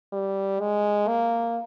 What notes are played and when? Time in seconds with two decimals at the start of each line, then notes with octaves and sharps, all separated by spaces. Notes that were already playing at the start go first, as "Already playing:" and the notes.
0.13 G3
0.60 G#3
1.08 A#3